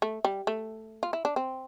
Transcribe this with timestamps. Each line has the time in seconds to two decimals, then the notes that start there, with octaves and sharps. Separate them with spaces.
0.02 A3
0.25 G3
0.47 A3
1.03 F4
1.13 E4
1.25 D4
1.36 C4